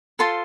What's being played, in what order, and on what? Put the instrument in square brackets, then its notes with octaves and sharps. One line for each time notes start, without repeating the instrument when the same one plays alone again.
[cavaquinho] F4 A4 C5 C6